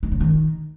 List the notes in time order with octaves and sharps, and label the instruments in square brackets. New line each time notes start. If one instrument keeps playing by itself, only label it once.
[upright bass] D#3
C#3
D#3